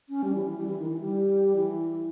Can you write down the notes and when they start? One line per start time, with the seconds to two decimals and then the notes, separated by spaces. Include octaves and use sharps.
0.09 C#4
0.24 G3
0.34 E3
0.46 E3
0.57 G3
0.67 E3
0.79 D#3
0.89 E3
1.00 G3
1.56 E3